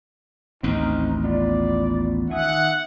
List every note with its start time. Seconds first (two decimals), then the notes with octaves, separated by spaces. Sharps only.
0.63 A1 D#2 C4 D#4 C6 F6
1.24 B3 F4 D5
2.30 D#3 E5 F#5 G#5 D#6